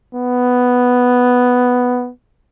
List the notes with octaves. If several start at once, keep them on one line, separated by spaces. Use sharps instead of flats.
B3